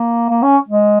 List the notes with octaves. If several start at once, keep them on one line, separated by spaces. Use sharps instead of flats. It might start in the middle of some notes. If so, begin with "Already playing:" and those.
Already playing: A#3
A#3
C#4
G#3